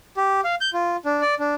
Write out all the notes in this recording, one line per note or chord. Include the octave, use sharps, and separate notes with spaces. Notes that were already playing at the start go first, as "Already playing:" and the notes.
G4
F5
G6
F4
D4
D5
D4